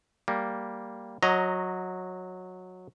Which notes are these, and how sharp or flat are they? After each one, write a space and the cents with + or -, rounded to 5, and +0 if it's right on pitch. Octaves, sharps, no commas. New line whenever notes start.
G3 +0 A#3 +0
F#3 -15 D#5 +0 A#5 -5